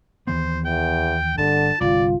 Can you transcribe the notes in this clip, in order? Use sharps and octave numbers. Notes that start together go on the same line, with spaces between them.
D#2 E3 B3 C5
E2 G5
G1 D3 A5
G1 C2 F4 D5